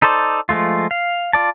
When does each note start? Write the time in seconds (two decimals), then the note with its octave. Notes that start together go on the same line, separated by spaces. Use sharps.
0.02 D#4 A4 C5 D5
0.49 F3 G#3 A3 F4
0.91 F5
1.33 F4 D5 A5